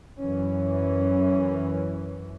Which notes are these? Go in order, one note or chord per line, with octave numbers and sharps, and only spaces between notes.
F#2 E3 C#4